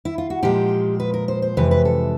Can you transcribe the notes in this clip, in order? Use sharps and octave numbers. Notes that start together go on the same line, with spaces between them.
E4
F4
F#4
A#2 F3 G#3 G4
B4
A#4
C5
C5
F2 C3 E3 G#3 B4
B4
A4